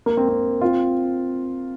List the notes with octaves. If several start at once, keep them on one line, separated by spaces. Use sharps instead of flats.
A#3
C4
C4
C4 F4